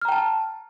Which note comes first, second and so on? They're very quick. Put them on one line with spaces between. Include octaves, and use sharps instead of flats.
F6 A#5 G5 A5